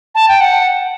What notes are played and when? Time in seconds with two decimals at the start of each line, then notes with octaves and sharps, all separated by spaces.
0.15 A5
0.28 G5
0.41 F#5